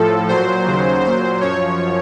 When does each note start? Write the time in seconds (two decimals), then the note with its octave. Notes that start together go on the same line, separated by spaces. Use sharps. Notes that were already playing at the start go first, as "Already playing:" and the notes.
Already playing: A2 F3 A4
0.28 A#2 F#3 C5
0.66 D#2 C#3 F#3
1.03 A#2 F#3 C5
1.41 F#2 F3 C#5